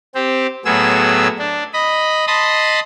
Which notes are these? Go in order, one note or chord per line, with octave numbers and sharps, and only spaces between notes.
C4 G4
A2 F#3 B3 G#4 E6
D4
D#5 B5
D#5 A5 B5 C6 D#6